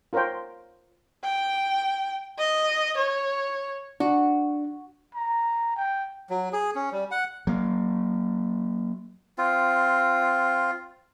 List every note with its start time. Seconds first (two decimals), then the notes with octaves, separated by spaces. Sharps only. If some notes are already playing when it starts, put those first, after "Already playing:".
0.13 F4 A#4 C5 C#5 G5
1.24 G5
2.39 D#5
2.97 C#5
4.00 D4 F#4
5.15 A#5
5.76 G5
6.30 F#3
6.53 G#4
6.75 C#4
6.92 G3
7.11 F#5
7.47 F#3 A#3
9.38 C4 F4